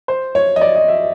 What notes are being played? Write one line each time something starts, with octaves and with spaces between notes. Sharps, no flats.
C5
C#5
D#5
D5
D#5
E5